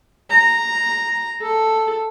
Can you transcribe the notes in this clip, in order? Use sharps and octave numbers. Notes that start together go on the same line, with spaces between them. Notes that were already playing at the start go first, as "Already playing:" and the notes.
A#5
A4